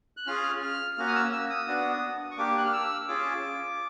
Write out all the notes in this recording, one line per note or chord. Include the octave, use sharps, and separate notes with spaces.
F#6
C#4 F4 G#4 F6
F6
A#3 C#4 F#4 F6
D#6
E6
E6
D#6
B3 D4 F#4
C#6
A#3 D4 G4 D6
F#6
F6
E6
C#4 F4 G#4 D6